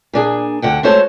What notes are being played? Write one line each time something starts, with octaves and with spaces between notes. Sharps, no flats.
A#2 D4 G#4
D2 D3 F#5 G5
G#3 A3 F#4 A4 C5 C#5